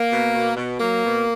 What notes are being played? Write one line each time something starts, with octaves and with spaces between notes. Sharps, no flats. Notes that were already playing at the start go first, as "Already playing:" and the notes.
Already playing: A#3
B2
B2
B2
F#3 A#3
B2